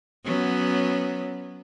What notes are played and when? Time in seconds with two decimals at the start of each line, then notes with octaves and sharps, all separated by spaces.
0.24 F#3 B3 C#4